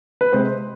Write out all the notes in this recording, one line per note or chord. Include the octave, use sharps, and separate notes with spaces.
B4
C3 G#3 C4 C5